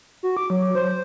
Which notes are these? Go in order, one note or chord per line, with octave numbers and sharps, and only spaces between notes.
F#4
D6
F#3
C5